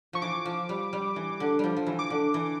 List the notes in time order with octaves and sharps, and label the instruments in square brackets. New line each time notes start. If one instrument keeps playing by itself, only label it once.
[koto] F3 [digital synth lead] C#6
[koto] E3 [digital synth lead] D6
[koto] F3
G3
G3
E3
D3
F3 G3
F3
E3
[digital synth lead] D6
[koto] D3
E3